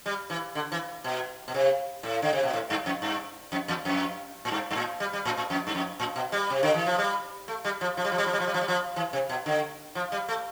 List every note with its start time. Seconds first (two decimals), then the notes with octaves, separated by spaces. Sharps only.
0.06 G3
0.30 E3
0.55 D3
0.72 E3
1.04 B2
1.48 B2
1.54 C3
2.03 A2
2.22 D3
2.33 C3
2.43 B2
2.53 A2
2.70 G2
2.86 F2
3.02 G2
3.52 F2
3.68 E2
3.85 F2
4.45 A2
4.51 G2
4.70 G2
4.75 A2
5.00 G3
5.13 G3
5.25 A2
5.37 A2
5.50 F2
5.67 G2
5.75 F2
6.00 A2
6.16 B2
6.32 G3
6.50 C3
6.63 D3
6.74 E3
6.86 F3
6.98 G3
7.48 A3
7.65 G3
7.81 F3
7.97 F3
8.05 G3
8.12 F3
8.18 G3
8.26 F3
8.33 G3
8.40 F3
8.47 G3
8.54 F3
8.61 G3
8.68 F3
8.96 E3
9.13 C3
9.29 B2
9.46 D3
9.95 F3
10.12 G3
10.28 A3